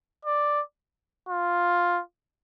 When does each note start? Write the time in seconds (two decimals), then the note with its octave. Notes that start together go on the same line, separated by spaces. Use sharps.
0.25 D5
1.29 F4